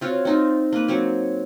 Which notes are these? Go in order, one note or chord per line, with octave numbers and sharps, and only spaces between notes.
C4 F4 F#4 C#5
C4 D#4 F4
A#3 B4
F#3 C4 C#5